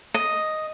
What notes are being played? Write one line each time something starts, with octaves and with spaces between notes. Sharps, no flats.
D#5